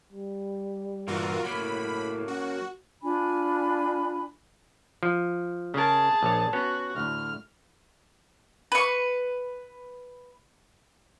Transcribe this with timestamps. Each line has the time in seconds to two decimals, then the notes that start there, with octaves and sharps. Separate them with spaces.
0.13 G3
1.08 G2 A#2 E3 F4 F#4 A#4
1.44 A2 F#3 A#3 B5
2.28 C#4 F#4
3.03 D4 F4 G#5 B5
5.03 F3
5.74 C#3 G#4 A#4 A5
6.23 A#1 C#5
6.53 B3 C#4 F#4 C#5
6.96 D2 A2 F6
8.72 B4 C#6